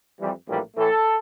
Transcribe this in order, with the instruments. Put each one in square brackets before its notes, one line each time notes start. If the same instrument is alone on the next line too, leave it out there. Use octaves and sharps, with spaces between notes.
[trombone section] F2 E3 G3
A#1 A2 E3 G3 A#3
A2 E3 A3 A4